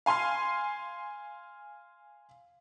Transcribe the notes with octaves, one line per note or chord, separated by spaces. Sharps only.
F5 G#5 C6 F6 C7